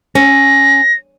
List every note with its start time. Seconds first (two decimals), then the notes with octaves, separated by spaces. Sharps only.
0.15 C#4 A#6